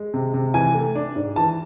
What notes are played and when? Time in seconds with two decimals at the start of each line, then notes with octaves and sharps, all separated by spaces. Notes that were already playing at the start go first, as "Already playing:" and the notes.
Already playing: G#3
0.14 C3
0.34 C3
0.54 E3 G#5
0.75 A3
0.95 D4
1.16 G#2
1.36 E3 A5